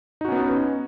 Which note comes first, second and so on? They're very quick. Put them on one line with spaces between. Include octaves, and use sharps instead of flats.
D#4 F#4 C#4 B3